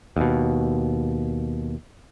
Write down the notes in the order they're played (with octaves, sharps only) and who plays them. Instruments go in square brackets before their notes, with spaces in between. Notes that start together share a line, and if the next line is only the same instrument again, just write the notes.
[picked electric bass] D#2 B2